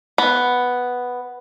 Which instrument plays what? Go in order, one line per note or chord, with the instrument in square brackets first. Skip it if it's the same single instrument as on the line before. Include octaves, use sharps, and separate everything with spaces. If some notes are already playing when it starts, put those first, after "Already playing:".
[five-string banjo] B3